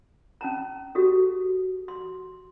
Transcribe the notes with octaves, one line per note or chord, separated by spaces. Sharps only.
C#4 A5 A#5
F#4 G4 A4
C6